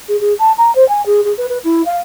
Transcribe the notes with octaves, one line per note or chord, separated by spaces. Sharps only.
G#4
G#4
A5
A#5
C5
G#5
G#4
G#4
B4
B4
E4
F5